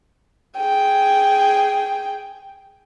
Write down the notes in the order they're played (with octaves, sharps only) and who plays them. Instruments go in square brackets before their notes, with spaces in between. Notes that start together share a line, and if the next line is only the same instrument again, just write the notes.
[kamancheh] G#4 G5